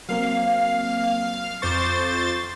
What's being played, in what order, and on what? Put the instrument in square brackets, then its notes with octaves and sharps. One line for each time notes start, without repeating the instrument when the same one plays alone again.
[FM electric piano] F#3 A#3 C4 [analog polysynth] F5
[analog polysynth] F2 C5 A6 [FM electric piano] C#6 D6